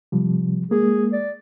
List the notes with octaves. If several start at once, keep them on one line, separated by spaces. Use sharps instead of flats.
C3 F3 G3
G#3 A#3 G#4
D5